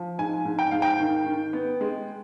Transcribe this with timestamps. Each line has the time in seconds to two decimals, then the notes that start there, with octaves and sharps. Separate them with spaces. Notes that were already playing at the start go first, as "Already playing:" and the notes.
Already playing: F3
0.18 G#2 G#5
0.45 G#2
0.59 G5
0.71 G#2 F5
0.82 G5
1.00 D#3
1.26 D#3
1.53 B3
1.81 G#3